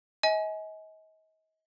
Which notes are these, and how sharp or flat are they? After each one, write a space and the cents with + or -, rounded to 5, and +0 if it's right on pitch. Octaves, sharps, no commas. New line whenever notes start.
D#5 +35 G#5 +20